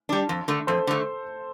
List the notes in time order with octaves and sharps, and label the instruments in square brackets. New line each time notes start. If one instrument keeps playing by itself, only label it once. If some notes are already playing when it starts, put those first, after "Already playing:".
[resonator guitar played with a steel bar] G3 D4
F2
D3 A3
[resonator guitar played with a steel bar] F2 [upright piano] A4 C5
[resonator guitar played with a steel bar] D3 A3